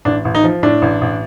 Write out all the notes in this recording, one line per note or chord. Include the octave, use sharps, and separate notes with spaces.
A1 D4
A1
D#4
F3
A2 D4
A1
A1